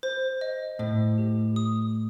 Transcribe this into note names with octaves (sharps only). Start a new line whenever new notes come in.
C5
D#5
A2 C5
G4
D#6